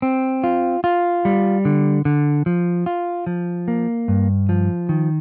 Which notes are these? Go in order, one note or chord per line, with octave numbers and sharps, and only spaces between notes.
C4
F4
F4
G3
D3
D3
F3
F4
F3
A#3
G2
F3
D#3